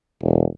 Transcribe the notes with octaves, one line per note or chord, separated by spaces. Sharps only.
E1